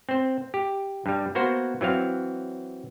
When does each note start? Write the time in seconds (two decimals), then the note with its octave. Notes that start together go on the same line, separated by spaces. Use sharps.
0.09 C4 C5
0.54 G4
1.06 G2 G3
1.35 A#3 B3 F#4 C5
1.81 E3 F#3 C4 F5